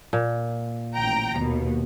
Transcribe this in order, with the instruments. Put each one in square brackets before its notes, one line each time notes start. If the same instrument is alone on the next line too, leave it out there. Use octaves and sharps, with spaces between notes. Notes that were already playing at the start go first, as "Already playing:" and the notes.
[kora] A#2
[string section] A1 G5 A#5
D#2 B2